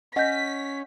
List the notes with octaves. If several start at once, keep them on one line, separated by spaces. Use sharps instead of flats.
C#4 D#5 F#5 G6 A#6 B6